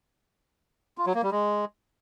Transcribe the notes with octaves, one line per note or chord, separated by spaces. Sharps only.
F4
F#3
A#3
G3
G#3